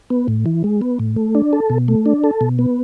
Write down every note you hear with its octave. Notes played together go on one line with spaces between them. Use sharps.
B3
A2
E3
G#3
B3
A2
A3
D4
A4
B2
A3
D4
A4
B2
B3